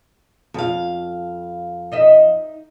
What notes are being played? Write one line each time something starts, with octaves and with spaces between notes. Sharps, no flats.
F2 F5
D#4 D#5 E5